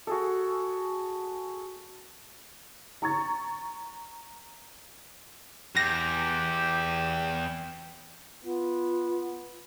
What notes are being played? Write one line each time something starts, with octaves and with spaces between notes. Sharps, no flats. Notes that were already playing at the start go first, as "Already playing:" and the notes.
F#4 G#4 A4
A#5 C#6 A6
E2 G4 G5 A#6
B3 F4